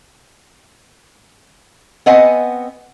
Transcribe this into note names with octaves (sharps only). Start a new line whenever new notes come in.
B3 C4 D#5 F#5 G#5